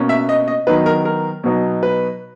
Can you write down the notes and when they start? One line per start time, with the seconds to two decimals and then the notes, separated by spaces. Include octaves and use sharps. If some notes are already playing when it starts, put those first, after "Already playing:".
Already playing: B2 A#3 C#4
0.09 E5
0.29 D#5
0.48 D#5
0.67 D#3 F#3 B3 D#4 B4
0.86 A#4
1.05 A#4
1.44 B2 F#3 B3 D#4
1.83 B4